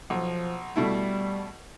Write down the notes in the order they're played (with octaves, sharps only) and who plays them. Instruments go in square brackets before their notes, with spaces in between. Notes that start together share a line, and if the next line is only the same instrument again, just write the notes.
[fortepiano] B1 [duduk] F3
[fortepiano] B2 A3 E4 [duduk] G3